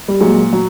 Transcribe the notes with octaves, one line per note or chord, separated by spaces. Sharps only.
G3
A#2 F#3 G#3
F#3